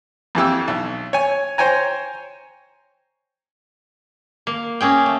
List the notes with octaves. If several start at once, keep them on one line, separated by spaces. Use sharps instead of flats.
F2 E3 G4 E6
B1
C#5 G#5
C5 C#5 G5 G#5 A#5
A#3
A#3 C#4 G#4 G5
A3